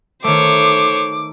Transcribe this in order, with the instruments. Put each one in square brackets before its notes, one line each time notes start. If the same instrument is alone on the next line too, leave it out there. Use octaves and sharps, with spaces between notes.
[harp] D#3 A3 [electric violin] C5 C#5 [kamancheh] D6